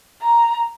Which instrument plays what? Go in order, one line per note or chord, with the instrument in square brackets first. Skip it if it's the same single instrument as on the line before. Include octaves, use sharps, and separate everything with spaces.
[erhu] A#5